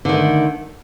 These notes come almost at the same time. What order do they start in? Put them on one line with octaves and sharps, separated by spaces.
D3 D#3 A3